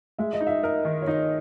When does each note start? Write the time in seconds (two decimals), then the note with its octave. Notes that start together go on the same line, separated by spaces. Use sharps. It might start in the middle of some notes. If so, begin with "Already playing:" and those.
0.19 G#3 E5
0.33 D#5
0.41 D#4
0.47 E5
0.63 A#4 D#5
0.85 D#3
1.02 C#5
1.07 D#4 D#5